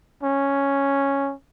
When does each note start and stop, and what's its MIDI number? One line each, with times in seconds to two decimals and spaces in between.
0.23 1.34 61